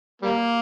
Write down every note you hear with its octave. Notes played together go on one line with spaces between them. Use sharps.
G3 A#3